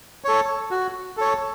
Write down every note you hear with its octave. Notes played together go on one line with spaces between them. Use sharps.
A4 C#5
F#4
A4 C#5